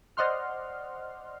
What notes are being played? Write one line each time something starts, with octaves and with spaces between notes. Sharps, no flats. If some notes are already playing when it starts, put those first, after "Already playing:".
C5 D5 D#5 F#5 C6 F6